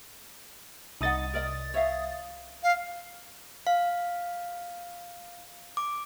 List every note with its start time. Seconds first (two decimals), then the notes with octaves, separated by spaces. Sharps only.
1.01 C2 D#4 D#5 F#5 D#6 A6
1.33 A#4 D5 D#5
1.74 C#5 E5 F5
2.63 F5
3.67 F5
5.77 D6